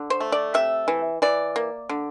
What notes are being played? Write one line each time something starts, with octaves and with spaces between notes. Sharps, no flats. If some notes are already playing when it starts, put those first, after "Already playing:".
Already playing: D3
C5
A3
D5
C3 E5
E3
E3 D5
A#3
D3